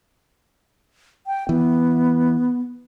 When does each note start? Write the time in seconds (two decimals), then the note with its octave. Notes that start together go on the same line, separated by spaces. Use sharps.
1.27 G5
1.49 E3 B3